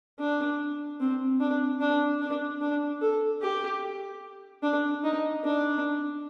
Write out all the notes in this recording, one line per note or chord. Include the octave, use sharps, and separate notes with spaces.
D4
C4
D4
D4
D4
D4
A4
G4
D4
D#4
D4